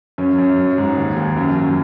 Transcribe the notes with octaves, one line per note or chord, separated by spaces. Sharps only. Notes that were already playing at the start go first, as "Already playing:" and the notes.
F#2 C#4
F#2
F#3
G#2
D#2
D#2
F#2
F#2